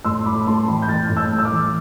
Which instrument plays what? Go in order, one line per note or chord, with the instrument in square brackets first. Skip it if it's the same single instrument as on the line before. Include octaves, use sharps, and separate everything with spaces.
[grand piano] A2 C6 E6
A2 B5 D6
D6
A3 A5 C6
E3 G5 B5
G6
A2 F6 A6
A2
E6 G6
A3
E6
D6 F6
E3